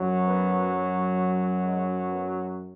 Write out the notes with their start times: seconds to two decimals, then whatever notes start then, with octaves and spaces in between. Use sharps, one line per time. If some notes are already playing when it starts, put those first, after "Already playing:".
Already playing: F#2 F#3
0.27 B3
1.63 G#3
2.10 B3